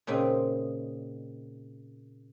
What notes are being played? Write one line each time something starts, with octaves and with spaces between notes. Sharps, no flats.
A#2 C#3 C4 D#4